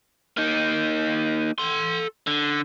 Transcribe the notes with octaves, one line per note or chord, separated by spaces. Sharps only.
A#3 D#4
A4 C6
D3